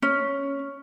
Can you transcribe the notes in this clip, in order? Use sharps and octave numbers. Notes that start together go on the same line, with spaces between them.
C#4